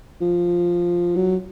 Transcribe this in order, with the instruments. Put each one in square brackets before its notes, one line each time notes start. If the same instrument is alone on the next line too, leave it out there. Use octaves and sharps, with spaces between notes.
[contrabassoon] F3
F#3